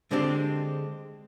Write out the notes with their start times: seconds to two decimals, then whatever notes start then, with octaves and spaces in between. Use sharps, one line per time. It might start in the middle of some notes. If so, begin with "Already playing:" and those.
0.11 D3 G#3 C4 D4 G4